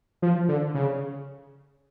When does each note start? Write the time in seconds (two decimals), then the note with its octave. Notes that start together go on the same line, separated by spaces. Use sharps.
0.22 F3
0.49 D3
0.74 C#3